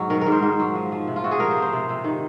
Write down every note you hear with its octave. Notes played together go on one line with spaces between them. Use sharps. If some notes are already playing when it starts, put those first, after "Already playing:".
Already playing: G#2 F#3
D#3 A#4
G#2 A#4
C5
G#2
F#3
F3
F3
C3
F4
C3 F#4
G#4
F3 A#4
C5
F3
C5
C3
C3
D#3